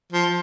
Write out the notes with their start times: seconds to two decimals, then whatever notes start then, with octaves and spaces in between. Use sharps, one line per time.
0.12 F3